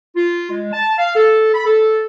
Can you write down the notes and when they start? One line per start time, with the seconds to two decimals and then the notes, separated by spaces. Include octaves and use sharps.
0.16 F4
0.50 G#3
0.73 A5
0.98 F5
1.16 A4
1.54 B5
1.66 A4